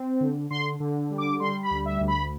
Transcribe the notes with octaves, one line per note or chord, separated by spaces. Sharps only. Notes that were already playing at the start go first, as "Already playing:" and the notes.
Already playing: C4
D3
D3 C6
D3
G3
D6
G3 C6
B5
D2
E5
D2
B5